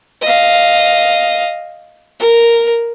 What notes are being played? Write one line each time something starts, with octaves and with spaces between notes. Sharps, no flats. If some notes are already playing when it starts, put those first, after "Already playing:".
D#5 F5
A#4